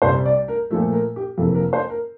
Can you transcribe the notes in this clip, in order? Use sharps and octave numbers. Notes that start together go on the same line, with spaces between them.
C2 C3 G3 C5
D5
A#4
A#2 F3 A3 A4
A#4
G4
F2 C3 E3 A#3 A4
A#4
C5
A#4